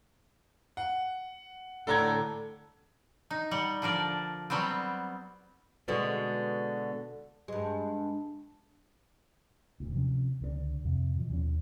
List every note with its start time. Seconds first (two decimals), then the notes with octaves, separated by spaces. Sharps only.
0.77 F#5
1.87 A2 D3 A4 A#5 G#6
3.31 D#4
3.51 G3 F#5
3.82 D3 F3 A#4 D5
4.50 F#3 G3 B3 C4
5.88 B2 D3 G#3
7.48 G2 G#3
9.80 D#1 D2
9.94 C3 F3 G#3 C#4
10.41 C#2 D3 A3 D4
10.85 F2 C3
11.16 B2 E3 F3
11.30 D#2 F3 C#4